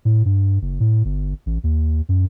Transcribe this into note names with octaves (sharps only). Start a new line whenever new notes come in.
A2
G2
F#1
A2
G1
A1
D#2
F#2